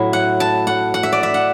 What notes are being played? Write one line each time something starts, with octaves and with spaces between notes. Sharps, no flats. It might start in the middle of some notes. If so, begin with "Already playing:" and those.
Already playing: A2 F#3 E4
F#5
A5
F#5
F#5
E5
D5
E5
F#5